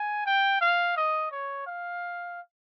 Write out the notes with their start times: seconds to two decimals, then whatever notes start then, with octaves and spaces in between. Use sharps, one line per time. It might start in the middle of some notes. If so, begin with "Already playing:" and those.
Already playing: G#5
0.26 G5
0.61 F5
0.97 D#5
1.31 C#5
1.66 F5